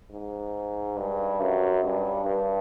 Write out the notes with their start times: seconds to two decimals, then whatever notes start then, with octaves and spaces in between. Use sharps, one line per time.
0.11 G#2
0.97 G2
1.40 F#2
1.83 G2
2.26 G2